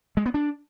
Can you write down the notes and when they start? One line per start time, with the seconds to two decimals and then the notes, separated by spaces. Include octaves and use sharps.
0.17 G#3
0.26 B3
0.34 D4